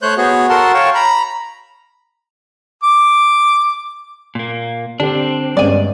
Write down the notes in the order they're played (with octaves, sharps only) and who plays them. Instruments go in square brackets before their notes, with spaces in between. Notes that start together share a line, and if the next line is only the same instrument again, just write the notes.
[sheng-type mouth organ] A3 C5 C#5 F#6 G6
B3 F#4 G#4 C#5
F#4 A4 A#4 F#5 A5 C6
C#5 F5 G5 A5 C#6
A#5 B5
[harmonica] D6
[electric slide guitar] A#2 A#3
[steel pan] D3 G4 A4 [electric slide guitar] C4 D4
[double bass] G2 [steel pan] G#3 B3 C#4 [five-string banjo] D5 G#5